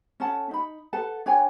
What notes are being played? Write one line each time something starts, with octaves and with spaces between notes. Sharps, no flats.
C#4 A4 F#5 A5
D#4 B5
A4 B4 F#5 A5
D4 C#5 G5 G#5